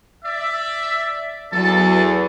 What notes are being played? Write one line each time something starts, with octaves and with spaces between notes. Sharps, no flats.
D5 E5
E2 F#3 A4 A5